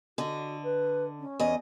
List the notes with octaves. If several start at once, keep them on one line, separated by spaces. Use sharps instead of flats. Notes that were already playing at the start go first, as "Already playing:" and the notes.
D3 F#4 D#5
B4
C#4
E2 D#5